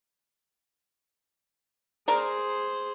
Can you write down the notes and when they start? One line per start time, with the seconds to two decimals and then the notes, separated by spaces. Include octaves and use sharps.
2.08 G#4 A#4 C5 D5